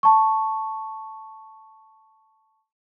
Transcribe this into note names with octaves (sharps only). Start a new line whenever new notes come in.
A5 C#6